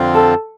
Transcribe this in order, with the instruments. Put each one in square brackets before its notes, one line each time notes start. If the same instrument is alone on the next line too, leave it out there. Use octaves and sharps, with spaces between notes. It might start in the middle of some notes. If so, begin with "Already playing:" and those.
Already playing: [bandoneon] F2 D3 F3 C4 F4
[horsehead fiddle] A4